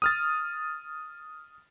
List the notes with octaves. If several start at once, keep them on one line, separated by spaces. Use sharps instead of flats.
D#6 F6 A6